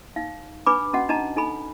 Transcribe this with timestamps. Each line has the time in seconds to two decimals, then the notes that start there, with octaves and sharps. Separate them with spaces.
0.16 D#4 F5
0.66 D4 B4 G#5 B5 D6
0.93 C#4 F#4 D#5 F#5
1.09 D4 D#4 D#5 A5 A#5
1.36 D#4 A4 G#5 B5